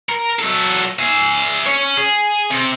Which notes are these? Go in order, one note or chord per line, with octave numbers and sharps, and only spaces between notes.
A#4
F#3 A4
G#4 E5
C#4 C#5
G#4
C3